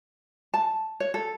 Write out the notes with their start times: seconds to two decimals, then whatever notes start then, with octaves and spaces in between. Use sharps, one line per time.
0.54 A5
1.00 C#5
1.14 A4